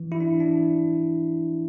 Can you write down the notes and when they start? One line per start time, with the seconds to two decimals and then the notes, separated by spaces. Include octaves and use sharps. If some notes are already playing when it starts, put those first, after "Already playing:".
Already playing: E3
0.12 E4
0.20 D4
0.40 D4